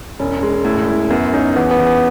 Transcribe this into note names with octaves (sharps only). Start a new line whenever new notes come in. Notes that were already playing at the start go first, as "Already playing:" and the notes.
E1 C#4
G#3
A2
E4
F#2 B3
C#4 D#4
E2 B3
B3
E2
B3